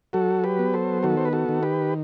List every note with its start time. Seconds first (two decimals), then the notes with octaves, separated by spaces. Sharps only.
0.13 F#3 F#4 A4
0.44 G4 B4
0.59 B3
0.74 A4 C5
1.03 D#3 F#4 A4
1.17 C5
1.25 B4
1.33 F#4 A4
1.49 D#3
1.63 G4 B4